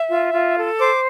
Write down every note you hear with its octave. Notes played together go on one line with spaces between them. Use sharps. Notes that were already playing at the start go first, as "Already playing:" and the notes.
Already playing: E5
F4
F4
A4
C5 D6